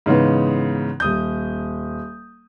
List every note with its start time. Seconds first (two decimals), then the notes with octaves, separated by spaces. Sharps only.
0.06 G#2 C#3 E3 B3
1.00 D#1 D#6 G6